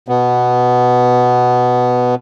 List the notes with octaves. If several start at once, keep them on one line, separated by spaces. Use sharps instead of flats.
B2 B3